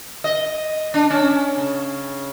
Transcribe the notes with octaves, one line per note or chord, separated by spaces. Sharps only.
D#5
D4
C#4
C#3